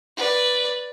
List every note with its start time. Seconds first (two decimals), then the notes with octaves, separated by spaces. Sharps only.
0.17 B4 D5